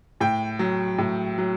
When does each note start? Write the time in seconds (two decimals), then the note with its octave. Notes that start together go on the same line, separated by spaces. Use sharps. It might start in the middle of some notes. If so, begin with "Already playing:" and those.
0.21 A2 G5
0.59 F#3
0.98 A2
1.38 F#3